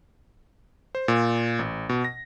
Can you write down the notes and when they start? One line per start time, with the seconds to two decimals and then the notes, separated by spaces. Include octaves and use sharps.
0.95 C5
1.08 A#2
1.59 A1
1.89 B2
2.04 A#6